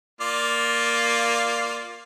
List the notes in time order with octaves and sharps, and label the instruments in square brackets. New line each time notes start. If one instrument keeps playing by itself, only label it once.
[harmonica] A#3 F4 D5